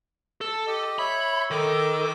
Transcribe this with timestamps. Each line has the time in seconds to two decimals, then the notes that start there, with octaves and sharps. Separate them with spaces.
0.41 A4
0.67 G4 D#5
0.99 C#5 E5 B5
1.51 D#3 A4 D6